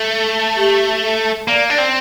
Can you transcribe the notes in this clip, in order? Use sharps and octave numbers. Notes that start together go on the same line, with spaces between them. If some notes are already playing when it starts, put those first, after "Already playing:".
Already playing: A3 A4
G4
A4
A#3 D5
D4 D5
C4